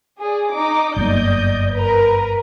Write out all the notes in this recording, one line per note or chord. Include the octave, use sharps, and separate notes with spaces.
G#4 D5
D#4 D6
G1 F#2 A#3 D5 D#5 G6
A#4 B4